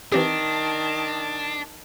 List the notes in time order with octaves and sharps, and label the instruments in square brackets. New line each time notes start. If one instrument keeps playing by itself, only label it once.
[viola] D#3 A5 [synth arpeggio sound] E3 C4 G4 [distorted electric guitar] D4